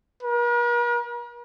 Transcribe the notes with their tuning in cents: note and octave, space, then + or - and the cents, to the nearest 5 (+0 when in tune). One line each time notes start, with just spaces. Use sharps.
A#4 +45